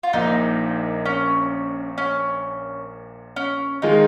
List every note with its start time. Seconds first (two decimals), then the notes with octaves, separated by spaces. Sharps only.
0.03 F4
0.13 A#1 A#2 A#3 D#4
1.06 C#4
1.98 C#4
3.36 C#4
3.82 D#3 G#3 D#4 F4 G#4